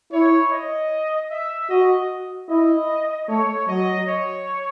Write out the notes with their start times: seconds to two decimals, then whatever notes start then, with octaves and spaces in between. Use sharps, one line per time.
0.13 E4 C#5
0.52 D#5
1.31 E5
1.70 F#4 D#5
2.49 E4 D#5
3.29 A3 C#5
3.68 F#3 D#5
4.08 C#5